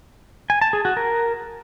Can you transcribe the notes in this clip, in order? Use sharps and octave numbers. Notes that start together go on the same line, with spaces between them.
G#5
A5
G#4
F#4
A#4